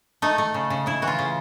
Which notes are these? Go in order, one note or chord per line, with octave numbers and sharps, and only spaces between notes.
A3 D#4
A3
C#3
C#3
C#3 E4
E3 F#4
F4
C#3